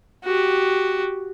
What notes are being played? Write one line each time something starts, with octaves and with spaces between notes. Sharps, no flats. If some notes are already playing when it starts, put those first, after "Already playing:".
F#4 G4